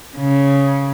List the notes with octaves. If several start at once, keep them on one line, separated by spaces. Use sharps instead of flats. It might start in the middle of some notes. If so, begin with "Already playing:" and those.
C#3